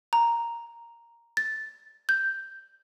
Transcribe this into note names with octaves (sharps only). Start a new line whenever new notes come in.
A#5
A6
G6